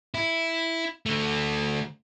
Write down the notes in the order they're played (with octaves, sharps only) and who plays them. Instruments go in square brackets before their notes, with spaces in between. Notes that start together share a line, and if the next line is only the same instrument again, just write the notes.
[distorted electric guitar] E4
D3 A3